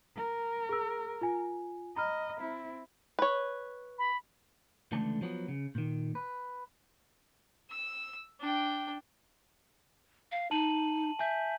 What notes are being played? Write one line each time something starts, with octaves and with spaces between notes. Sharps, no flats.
A#4
G#4 E6
F4 G#5
D#5 A#5 B5 F6
C4 E4
B4 C#5
B5
C#2 D3 E3 A3 A5
F3 F#3 B3
C#3
A#2 D#3
B4
E6
D4 G5
F5
D#4 A5 D#7 F#7
E5 G#5 G6